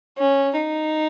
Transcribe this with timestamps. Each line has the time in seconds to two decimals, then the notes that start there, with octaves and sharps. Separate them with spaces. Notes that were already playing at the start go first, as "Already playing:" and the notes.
0.18 C#4
0.57 D#4